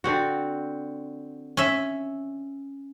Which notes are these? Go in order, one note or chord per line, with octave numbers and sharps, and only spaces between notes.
D3 C4 F#4
C#4 E5